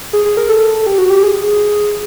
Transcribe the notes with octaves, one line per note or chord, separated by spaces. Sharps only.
G#4
G#4
A#4
A4
G4
F#4
G4
G#4